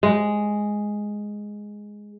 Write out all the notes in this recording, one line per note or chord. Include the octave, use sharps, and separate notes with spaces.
G#3